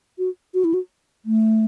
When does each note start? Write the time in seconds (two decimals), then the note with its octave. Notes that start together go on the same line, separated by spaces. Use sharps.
0.18 F#4
0.54 F#4
0.64 E4
0.74 F#4
1.25 A3